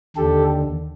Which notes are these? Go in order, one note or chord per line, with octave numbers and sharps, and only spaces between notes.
D#2 D3 G4 A4